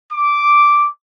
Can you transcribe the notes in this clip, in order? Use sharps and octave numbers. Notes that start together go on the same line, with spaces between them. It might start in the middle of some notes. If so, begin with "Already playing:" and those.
D6